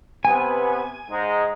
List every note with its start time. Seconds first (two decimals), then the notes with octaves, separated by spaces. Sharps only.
0.25 C3 B3 G#5
1.10 G#2 G#3 D#4